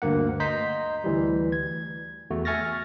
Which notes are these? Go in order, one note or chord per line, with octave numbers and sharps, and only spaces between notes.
D2 G2 A#3 F#5
D#5 A#5 C6 G6 B6
D2 E3 G3
G#6
E2 A3 F#4
E5 G#5 C#6 F6 A6 A#6